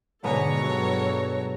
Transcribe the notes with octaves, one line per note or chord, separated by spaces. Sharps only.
G#2 B2 D3 G#3 A4 B4 C#5 A#5
G2 F#3